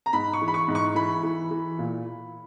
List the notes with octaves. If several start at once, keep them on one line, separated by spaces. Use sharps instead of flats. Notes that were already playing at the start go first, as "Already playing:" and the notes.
A#5
G#2 B5
C#6
E3
B5
C#6
G#2
C#6
E3 B5
E3
E3
A#2